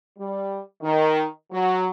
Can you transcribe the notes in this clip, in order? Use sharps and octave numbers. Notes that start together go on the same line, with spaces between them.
G3
D#3
F#3